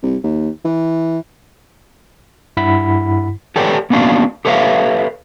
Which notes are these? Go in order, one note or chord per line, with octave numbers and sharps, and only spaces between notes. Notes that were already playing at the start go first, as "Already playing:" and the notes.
C2
D#2
E3
G2 E4 F#5 B5 B6
G4 A4 B4 C#5 D5 G5
A#3 B3 C#4 D4 F#4 F5
G4 A4 B4 C#5 E5 F5